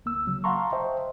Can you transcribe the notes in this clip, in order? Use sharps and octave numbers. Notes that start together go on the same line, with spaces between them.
D2 A#3 E6
C#3 F#3
F5 F#5 A5 A#5 C6 C#6
C5 D#5 E5 G5